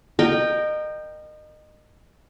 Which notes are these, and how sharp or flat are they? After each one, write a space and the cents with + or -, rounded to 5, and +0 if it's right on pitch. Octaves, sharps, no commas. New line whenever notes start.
A#4 +0 D#5 -30 G5 +0